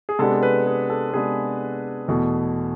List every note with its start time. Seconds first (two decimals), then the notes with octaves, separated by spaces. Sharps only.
0.09 G#4
0.19 C3 G#3 B3 D4 A4
0.43 B4
0.67 G#4
0.90 A4
1.13 C3 G#3 B3 D4 G#4
2.08 E2 B2 A3